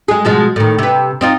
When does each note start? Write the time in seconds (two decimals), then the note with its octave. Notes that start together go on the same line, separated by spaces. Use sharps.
0.08 G#3 G#4
0.25 B2 F3 G#3
0.56 A2 D#3
0.78 C3 B4
1.21 C4 D#4 F4